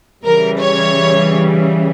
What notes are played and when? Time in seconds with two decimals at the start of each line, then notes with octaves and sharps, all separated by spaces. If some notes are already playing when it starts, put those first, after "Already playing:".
0.24 C#3 E3 G3 A#4
0.60 C#5